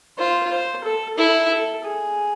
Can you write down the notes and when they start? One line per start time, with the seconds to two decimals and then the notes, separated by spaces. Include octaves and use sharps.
0.18 F4 C5
0.51 C5
0.84 A4
1.18 E4 A4
1.51 A4
1.84 G#4